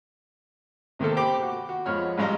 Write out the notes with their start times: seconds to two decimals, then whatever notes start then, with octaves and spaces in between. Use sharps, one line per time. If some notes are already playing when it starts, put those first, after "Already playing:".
0.99 C3 D#3 A#3 C4 A4
1.16 G4 C5 G5 B5 D6
1.42 F#4
1.69 F#4
1.86 F2 F3 G#3 C#5 B5 F6
2.18 A1 G3 G#3 F5 A#5